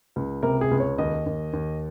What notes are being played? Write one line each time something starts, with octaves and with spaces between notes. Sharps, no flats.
C#2
C3 A#4
G#4
C#2
C#5
D#2 D#5
D#2
D#2